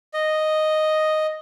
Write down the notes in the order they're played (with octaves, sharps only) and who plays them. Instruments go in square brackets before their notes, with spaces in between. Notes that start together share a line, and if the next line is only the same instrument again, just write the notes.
[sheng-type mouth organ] D#5